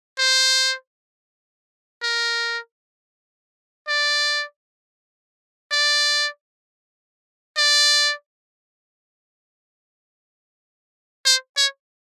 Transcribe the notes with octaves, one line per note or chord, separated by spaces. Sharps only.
C5
A#4
D5
D5
D5
C5
C#5